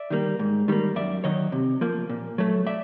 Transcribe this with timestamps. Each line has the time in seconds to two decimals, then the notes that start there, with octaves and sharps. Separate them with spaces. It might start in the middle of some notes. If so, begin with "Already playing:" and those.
Already playing: D5 E5
0.10 D#3 G3 A#3
0.39 G#2
0.68 D#3 G3 A#3
0.96 F#2 D5 E5
1.24 D#3 F#3 C#5 D#5
1.52 C3
1.81 F3 A#3
2.09 A#2
2.38 F#3 A3
2.67 D5 E5